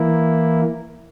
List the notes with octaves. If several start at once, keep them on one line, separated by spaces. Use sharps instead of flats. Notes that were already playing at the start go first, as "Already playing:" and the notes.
Already playing: E3 A#3 E4